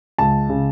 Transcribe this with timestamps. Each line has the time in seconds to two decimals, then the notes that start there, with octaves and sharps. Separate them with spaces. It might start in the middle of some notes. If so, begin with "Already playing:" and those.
0.18 C#2 A5
0.49 C#3